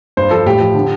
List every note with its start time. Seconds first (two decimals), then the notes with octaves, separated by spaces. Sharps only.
0.17 G2 C5
0.31 F3 A4
0.46 A2 G4
0.60 F3
0.74 D3